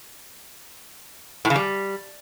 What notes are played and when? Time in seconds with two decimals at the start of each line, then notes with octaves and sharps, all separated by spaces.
1.45 A2
1.50 C#3
1.56 G3